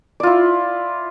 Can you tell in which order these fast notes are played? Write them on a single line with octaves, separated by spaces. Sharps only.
D5 F4 E4